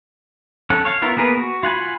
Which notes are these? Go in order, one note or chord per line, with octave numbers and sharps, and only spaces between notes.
C#4 A4 F#5
C#5 F5
B3 E4 F4 A#4
A#3 B3 G#4 A#4 B4
F#4
F4 F#5 G#5 B5